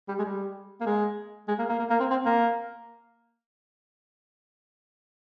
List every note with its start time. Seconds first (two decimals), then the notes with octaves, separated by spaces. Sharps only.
0.08 G3
0.19 G#3
0.24 G3
0.81 A#3
0.86 G#3
1.48 G#3
1.58 A#3
1.69 A#3
1.79 A#3
1.90 A#3
2.00 C4
2.10 C4
2.25 A#3